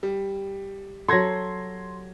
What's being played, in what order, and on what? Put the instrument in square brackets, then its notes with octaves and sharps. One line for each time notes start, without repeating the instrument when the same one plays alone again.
[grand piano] G3
[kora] F#3 A4 [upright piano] C6 G#6 A#6